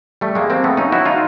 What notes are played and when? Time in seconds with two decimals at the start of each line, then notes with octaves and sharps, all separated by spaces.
0.21 G3 A3
0.35 G#3 A#3
0.50 A#3 C4
0.64 A3 B3
0.77 C#4 D#4
0.92 E4 F#4
1.05 D#4 F4